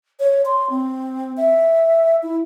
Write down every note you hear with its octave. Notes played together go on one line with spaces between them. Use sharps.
C#5
C6
C4
E5
E4